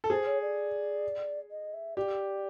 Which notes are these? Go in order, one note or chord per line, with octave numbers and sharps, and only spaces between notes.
A4
G#4 C5
C#5
D5
D#5
E5
G4 D5